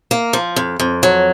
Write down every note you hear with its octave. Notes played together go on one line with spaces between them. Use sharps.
A#3
F3
F2
F2
F#3